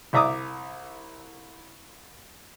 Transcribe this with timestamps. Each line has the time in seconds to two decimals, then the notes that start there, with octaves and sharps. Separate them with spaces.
0.13 C2 D5 E5 A#5 D6 D#6